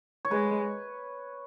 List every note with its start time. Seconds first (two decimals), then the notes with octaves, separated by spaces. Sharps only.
0.25 C#5
0.31 G#3 B4